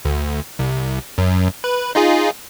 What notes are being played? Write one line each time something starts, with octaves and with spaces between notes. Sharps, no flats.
D2
C2
F#2
B4
D#4 F4 G#4